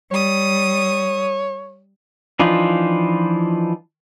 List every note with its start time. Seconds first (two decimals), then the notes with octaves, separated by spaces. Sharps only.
0.11 G3 C#5 D#6
2.40 E3 F3 D4 D#4 F4